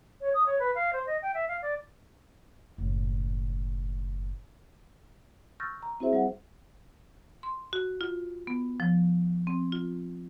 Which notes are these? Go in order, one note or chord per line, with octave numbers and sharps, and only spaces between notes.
C#5
D#6
C#5
B4
F5
C5
D#5
G5
E5
F5
D5
F#1 A2
C#6 E6 F6 G6 A6 A#6
A#5
C4 E4 F#4 G#4 C5 E5
G3 F#5
C6
F#4
F4
B3
F3
C4
F4